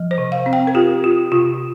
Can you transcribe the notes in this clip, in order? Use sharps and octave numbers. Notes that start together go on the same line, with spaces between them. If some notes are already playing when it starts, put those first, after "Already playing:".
Already playing: F3
C5
C3
F5
C4
G5
A#4
F4 G4
F4
C3 F4